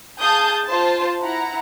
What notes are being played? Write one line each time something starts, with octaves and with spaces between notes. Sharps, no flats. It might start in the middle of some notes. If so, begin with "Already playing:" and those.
G#4 F5 A5 D#6 G6
F4 C5 A5
E4 F#5 A#5